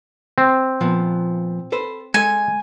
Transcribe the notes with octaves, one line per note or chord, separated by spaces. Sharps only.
C4
A#2 F3 B3
A4 B4 C5
G#3 A4 G#5